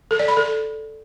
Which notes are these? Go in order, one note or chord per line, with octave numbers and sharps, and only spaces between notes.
A4
D5
B5
A4